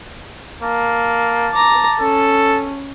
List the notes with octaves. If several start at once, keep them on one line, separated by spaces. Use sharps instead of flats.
A#3 A5
A#5 D6
C#4 A4